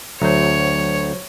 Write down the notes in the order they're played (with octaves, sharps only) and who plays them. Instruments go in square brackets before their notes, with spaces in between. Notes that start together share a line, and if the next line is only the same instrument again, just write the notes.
[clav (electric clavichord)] D2 [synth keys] F#3 C5 [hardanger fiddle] C#5